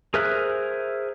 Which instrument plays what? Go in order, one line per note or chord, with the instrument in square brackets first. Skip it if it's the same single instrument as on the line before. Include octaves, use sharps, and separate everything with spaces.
[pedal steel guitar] G#4 A#4 C5 E5 F#6